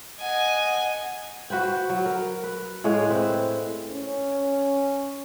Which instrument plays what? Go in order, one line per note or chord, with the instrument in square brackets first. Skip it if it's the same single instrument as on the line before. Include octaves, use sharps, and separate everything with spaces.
[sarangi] D#5 [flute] F#5 [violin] G#5
[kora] F#4 B4 C5 G5
F#3
A#4
B4
A2 G#3 C#5 F5
C4 B4
[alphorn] C#4